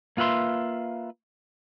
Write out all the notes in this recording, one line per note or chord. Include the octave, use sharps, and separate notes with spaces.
A#3 F4 B4 E5 C6